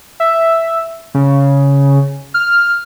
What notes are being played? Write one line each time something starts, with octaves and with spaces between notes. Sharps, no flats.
E5
C#3
F6